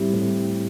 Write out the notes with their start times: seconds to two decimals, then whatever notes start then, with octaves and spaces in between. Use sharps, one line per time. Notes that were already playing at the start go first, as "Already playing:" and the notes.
Already playing: A2 G3 C4 E4 G4
0.14 A2